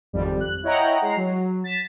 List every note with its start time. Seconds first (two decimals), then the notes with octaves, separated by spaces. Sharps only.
0.13 G#1 F2 G3
0.40 F#6
0.63 E4 C#5 D#5 F#5 G5 A#5
1.02 G#3 A#5 C7
1.17 F#3
1.64 A6 B6 E7